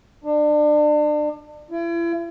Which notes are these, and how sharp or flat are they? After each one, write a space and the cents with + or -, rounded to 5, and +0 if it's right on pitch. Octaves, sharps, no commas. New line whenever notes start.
D4 +30
E4 +40